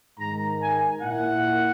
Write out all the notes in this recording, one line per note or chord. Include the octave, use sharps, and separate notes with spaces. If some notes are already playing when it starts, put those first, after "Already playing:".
G#2 D#3 G#3 A#5
G#5
A#2 A#3 E4 F#5